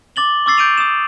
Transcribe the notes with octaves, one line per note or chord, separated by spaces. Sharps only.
D6 A6 F#7 G7
C#6 D6 E6 A6 C7
G6 D7 D#7 F7
D#6 E7